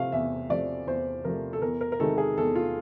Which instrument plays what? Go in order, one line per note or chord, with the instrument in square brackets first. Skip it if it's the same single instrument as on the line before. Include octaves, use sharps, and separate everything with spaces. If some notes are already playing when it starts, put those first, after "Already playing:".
Already playing: [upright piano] C3 F3 A3 F5
E2 E5
C3 F3 A3 D5
E2 C5
C3 F3 A3 A#4
A4
E2 A#4
A#4
A#4
C3 D#3 G#3 A4
G#4
E2 A4
F4